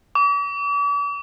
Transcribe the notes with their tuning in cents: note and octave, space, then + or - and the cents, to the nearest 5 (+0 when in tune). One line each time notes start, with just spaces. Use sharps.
D6 -45